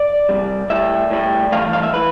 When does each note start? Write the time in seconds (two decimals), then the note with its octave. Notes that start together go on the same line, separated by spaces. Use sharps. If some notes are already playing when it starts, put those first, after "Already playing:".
Already playing: D5
0.29 C2 C3 G3
0.70 A2 G3 E5
1.11 A2 G3
1.52 G2 E3 A3 F5
1.73 F5
1.83 E5
1.94 E3 B4